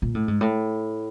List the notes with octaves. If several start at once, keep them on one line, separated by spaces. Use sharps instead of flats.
A#2
A2
G#2
A2